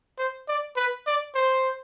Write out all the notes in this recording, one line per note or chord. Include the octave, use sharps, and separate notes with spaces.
C5
D5
B4
D5
C5